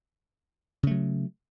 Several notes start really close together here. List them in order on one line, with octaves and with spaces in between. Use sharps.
C#3 A3 F#3